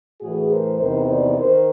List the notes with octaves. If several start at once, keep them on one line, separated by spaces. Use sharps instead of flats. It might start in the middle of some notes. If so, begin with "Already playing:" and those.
A2 E3 F#4 G#4
A#4 C5
E2 C3 D#3 A#4 C5
C5 D5
D#3 A#4 C5